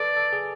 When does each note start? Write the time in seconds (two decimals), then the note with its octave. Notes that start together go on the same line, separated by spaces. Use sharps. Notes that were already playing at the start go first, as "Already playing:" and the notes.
Already playing: A4 B4 D5
0.17 A4
0.33 G#4